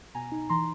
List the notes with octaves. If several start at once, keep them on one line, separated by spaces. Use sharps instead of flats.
B2 G#5 A#5
D#4
E3 A#5 C6